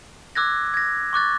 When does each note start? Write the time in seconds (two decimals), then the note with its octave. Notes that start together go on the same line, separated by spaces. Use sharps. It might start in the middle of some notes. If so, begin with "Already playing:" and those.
0.35 D6 E6 F#6 G#6 A#6
0.74 G#6 A#6
1.13 C#6 D6 F#6 A6